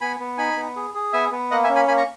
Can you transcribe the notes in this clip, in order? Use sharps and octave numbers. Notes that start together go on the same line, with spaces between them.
B3 G#5 B5
B3
D#4 G#5 B5
B3
G#4
G#4
B3 E5 G#5
B3
A#3 D#5 F#5
E5 G#5
C#4
G#5 B5
A#3 G#5 B5
A#5 C#6